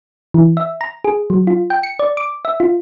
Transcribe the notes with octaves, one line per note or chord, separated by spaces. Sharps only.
E3
E5
A#5
G#4
F#3
F4
G5
C#7
D5
D6
E5
F4